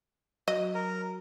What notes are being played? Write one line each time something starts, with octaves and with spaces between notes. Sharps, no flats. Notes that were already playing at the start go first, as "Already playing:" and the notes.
F#3 D#5
A#4